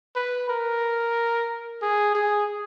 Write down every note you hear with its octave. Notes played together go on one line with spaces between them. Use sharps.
B4
A#4
G#4
G#4